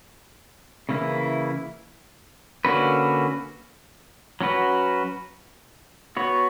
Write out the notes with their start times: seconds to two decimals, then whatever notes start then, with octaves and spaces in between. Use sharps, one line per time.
0.89 C#3 E3 A#3 E4
2.65 D3 A#3 C#4 F#4 B4
4.41 F#3 C#4 F#4 B4
6.17 B3 F#4 C#5